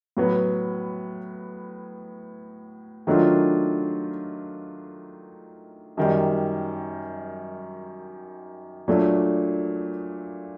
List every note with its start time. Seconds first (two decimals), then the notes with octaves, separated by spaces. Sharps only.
0.17 A2 F#3 B3
3.07 D#3 F#3 A3 D4 F4
5.97 F#2 D#3 G3
8.88 A#2 F#3 A3 D4